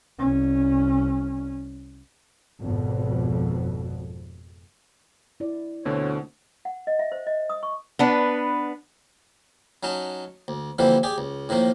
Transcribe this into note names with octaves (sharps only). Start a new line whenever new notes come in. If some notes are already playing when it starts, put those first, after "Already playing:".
C2 C#4
G#1 F2 B2
E4 D5
D2 B2 D3 C4 C#5
F#5
D#5
E5
C5
D#5
D#6
C#6
B3 D4 B4
F#3 C#4 D#4 A5
D2
D3 E3 F3 G3 A#3 C4
G4 G#4 D5
C#2
A2 D#3 F3 A#3